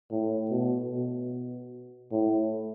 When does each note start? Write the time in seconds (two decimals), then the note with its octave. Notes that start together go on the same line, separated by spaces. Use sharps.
0.11 A2
0.50 B2
0.91 B2
2.12 A2